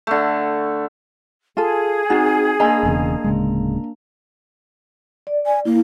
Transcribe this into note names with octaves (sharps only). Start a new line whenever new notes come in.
D3 A3
F4 G#4 A4
C4 D#4 F#4
A#3 D4 D#5 G#5 A#5 B5
E1 E2 C#3
D1 C#3 G#3
D5
G#5
A#3 E4